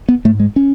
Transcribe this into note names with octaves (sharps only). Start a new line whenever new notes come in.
B3
G#2 A3
G#3
C#4